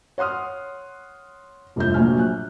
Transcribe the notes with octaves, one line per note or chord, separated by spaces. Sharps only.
C#5 F#5 C6 D#6 F6
F1 G2 A3 F4 G6
A#1 F#3 A#3 G#5 F6
F#6